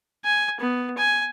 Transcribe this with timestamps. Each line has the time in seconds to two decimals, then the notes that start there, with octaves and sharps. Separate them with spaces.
0.25 G#5
0.61 B3
0.98 G#5